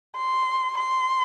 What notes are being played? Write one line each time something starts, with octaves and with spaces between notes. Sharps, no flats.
C6
C6